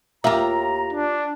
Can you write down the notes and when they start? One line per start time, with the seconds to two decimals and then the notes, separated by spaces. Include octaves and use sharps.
0.24 D#2 F4 G4 A#4 E5 A#5
0.93 D4